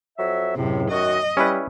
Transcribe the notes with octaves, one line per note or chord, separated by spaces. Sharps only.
F2 F#3 E5
C#2 F#2 A2 C3
F#2 D#3 F#4 D#5
G3 C#4 E4 B4